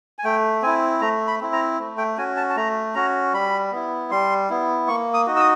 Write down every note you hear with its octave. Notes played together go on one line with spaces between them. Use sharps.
G#5
A3 G5
C4 E4 G#5
A3 A#5
B5
C4 E4
A#5
A3
G5
C#4 F#4 G#5
A5
A5
A3 A#5
C#4 F#4 A#5
G3 B5
B3 E4
G3 C6
B3 E4
A#3 C#6
D#6
D#4 F#4
E6
D#6